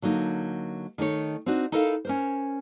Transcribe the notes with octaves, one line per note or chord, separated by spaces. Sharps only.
D3 F#3 A#3 D#4
D#3 A3 D#4 C#5
C4 D4 D#4 F#4
D#4 E4 A4 A#4 D#5 F5
C#4 A#4 C5